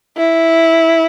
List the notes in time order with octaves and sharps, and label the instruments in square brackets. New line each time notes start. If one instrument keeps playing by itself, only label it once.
[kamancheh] E4